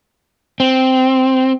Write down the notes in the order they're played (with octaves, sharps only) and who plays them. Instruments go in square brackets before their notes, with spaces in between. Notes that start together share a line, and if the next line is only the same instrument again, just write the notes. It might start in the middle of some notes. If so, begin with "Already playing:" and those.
[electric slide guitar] C4